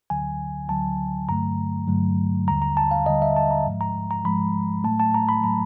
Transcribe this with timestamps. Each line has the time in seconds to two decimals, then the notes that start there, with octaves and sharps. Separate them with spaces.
0.10 D2 D3 F#3 G#5
0.69 D2 D3 F#3 A5
1.28 G2 D3 F#3 A3 A#5
1.88 G2 D3 F#3 A3
2.47 D#2 D3 G3 A#5
2.62 A#5
2.77 A5
2.91 F5
3.06 D#2 D3 G3 D#5
3.22 E5
3.37 A5
3.51 A#5
3.65 G#2 F3 G#3
3.81 A#5
4.11 A#5
4.25 G#2 F3 G#3 B5
4.84 A2 F#3 A3 A5
5.00 A5
5.14 A#5
5.29 B5
5.44 A2 F#3 A3 A#5